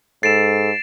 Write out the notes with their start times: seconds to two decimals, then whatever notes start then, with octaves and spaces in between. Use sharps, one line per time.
0.23 G#2 A4 A6 C7 D7 E7